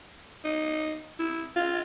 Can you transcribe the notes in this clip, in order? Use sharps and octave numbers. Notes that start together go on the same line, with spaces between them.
D#4
E4
F4